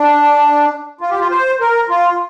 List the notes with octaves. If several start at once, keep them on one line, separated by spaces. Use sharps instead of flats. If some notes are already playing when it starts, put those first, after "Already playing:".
Already playing: D4
F4
G4
F4
C5
A#4
F4